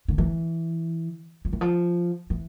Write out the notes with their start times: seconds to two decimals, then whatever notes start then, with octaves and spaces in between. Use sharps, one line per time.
0.08 D3
0.18 E3
1.45 F3
1.53 E3
1.61 F3
2.30 E3